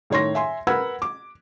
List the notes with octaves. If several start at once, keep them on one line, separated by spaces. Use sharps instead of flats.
A2 D#3 C#5 C6 A#6
E5 G#5 C6
A#4 B4 F#5 B5 E6 G#6
D6